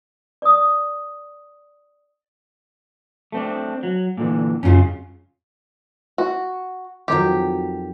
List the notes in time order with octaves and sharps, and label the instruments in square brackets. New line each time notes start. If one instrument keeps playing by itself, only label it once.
[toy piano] D5 D#6
[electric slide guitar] A3 C4 D4
F#3
A#2 D3 E3
[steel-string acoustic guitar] F#2 A#2 C#3 [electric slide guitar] C#4 F4
[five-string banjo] F#4
[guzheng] F2 D#3 F#3 [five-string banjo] G4